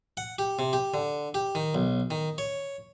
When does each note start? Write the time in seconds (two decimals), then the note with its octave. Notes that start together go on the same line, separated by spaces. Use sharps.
0.17 F#5
0.39 G4
0.59 C3
0.73 G4
0.94 D3
1.34 G4
1.55 D#3
1.75 B1
2.11 D#3
2.38 C#5